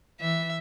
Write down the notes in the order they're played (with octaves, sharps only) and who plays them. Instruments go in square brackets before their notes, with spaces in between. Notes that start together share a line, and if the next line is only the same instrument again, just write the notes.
[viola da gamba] E3 [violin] E5